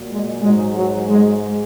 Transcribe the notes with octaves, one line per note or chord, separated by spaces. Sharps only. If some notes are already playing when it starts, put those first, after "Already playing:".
Already playing: A#2 F#3
G#3
G#2 F#3 G#3
F#3
G#3